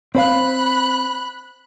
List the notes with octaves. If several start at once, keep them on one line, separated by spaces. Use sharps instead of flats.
C4 C5 F5 B5 F#6